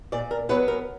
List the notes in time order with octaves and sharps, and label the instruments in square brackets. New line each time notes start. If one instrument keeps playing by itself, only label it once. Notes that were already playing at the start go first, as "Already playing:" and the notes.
[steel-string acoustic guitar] A#2 D5
A#4
F#3 B3 B4
A#4